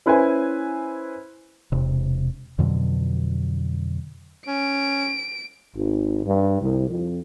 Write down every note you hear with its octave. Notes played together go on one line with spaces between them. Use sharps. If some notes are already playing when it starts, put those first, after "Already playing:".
C#4 E4 B4 C5 E5 G#5
E1 C3
F2 B2 D3 F#3
C#4 D7
G#1
G2
C2
F2